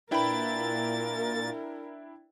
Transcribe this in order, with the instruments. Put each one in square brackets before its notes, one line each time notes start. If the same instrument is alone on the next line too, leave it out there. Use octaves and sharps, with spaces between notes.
[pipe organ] A#2 A6 [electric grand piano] D4 E4 G5 [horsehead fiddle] A#4 [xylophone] B4 B5